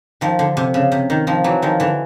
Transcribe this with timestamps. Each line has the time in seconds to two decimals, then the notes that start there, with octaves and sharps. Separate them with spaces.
0.21 D#3 F3
0.39 D3
0.57 C3
0.74 C#3
0.92 C3
1.10 D#3
1.27 D#3 F3
1.44 E3 F#3
1.62 D#3 F3
1.80 D3 E3